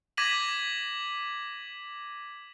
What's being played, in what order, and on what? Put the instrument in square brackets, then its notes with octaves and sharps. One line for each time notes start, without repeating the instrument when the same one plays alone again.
[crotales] D6 G#6 A#6 B6 D#7 F#7